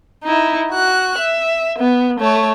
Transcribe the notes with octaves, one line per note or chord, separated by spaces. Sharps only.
D#4 E4
F#4 F#6
E5
B3
A3 C#5